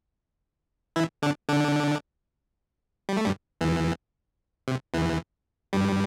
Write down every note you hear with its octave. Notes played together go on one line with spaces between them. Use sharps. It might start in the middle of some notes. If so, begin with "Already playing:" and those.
E3 E4
D3 D4
D3 D4
G3
A3
G2 G3
E2 E3
C3
E2 E3
G2 G3